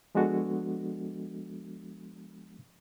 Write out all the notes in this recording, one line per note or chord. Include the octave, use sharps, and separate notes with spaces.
F3 G#3 B3 D4 F#4 A4